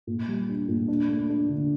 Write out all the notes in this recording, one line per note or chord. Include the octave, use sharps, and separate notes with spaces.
A#2
G3
D4
A#2
D4
A3
D4
D3